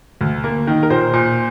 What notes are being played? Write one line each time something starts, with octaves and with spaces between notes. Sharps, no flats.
D2
A#3
D#3
A#4
A#2 C5
A#2